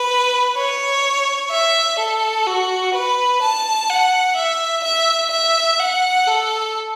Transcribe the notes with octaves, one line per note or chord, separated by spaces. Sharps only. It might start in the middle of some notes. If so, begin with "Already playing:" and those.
Already playing: B4
C#5
E5
A4
F#4
B4
A5
F#5
E5
E5
E5
F#5
A4